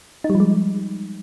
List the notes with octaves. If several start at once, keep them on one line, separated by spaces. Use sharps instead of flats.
D#4
G3
F3
G#3